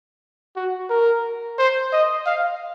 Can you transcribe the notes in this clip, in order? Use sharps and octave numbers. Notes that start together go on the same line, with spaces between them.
F#4
A#4
C5
D#5
F5